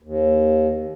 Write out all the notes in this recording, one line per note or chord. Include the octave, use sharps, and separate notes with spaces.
D#2